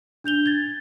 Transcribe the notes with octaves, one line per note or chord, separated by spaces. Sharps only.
D4 G6 F7 G7
G#6 A6